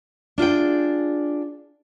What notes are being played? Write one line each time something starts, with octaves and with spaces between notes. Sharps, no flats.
D4 F4 G#4 G5